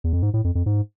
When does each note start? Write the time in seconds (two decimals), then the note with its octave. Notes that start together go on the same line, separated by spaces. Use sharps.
0.04 E2
0.13 F2
0.22 G#2
0.34 A2
0.44 F2
0.55 F2
0.66 G#2